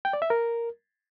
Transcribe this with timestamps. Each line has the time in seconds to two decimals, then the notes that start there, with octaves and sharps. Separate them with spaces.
0.05 G5
0.13 D5
0.22 E5
0.30 A#4